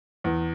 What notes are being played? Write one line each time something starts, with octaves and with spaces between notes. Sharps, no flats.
E2